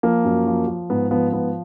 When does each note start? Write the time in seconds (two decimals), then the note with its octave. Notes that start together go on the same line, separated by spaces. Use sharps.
0.03 F3 A#3
0.25 F#2
0.47 F3
0.68 F3
0.90 G#2 B3
1.11 F3 B3
1.32 G#2 B3